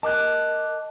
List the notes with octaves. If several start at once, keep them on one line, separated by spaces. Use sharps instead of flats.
A#4 D#5 A5 D6 F#6 G6